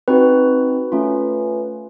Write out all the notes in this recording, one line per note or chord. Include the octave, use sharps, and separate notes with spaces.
C4 D#4 F#4 B4
A3 C#4 F4